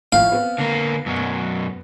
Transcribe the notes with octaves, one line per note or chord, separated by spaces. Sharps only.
A2 F3 E4 F5
B3 C4
D3 A#3
F#2 B2 F#3